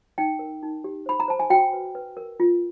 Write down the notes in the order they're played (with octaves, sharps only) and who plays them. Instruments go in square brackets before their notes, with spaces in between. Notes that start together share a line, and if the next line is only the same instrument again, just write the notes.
[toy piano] D#4 G5
A#4
D#4
G4
C5 B5
A#5
C5 A5
G#5
F#4 G5
B4
B4
A#4
F4